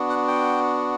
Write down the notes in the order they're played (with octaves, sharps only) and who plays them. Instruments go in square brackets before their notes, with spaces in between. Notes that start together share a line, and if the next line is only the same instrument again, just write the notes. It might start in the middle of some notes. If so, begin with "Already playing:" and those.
Already playing: [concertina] B3 D4 F#4
F#5
G5